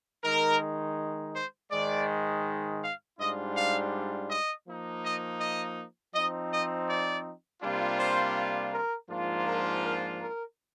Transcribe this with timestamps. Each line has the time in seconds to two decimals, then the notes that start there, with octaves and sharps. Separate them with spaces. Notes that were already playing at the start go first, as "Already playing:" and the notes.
0.23 D#3 G#3 D#4 A#4
1.35 C5
1.71 G#2 D#3 G#3 D5
2.82 F5
3.19 G#2 G3 D4 F4 D#5
3.56 F5
4.29 D#5
4.66 F3 A#3 D#4
5.03 D#5
5.40 D#5
6.14 F3 C4 D#4 D#5
6.51 D#5
6.88 D5
7.62 C3 G3 A#3 D4 F4
8.00 C5
8.72 A#4
9.09 G#2 F3 A#3 D4 F4
9.47 A#4
9.84 A#4
10.21 A#4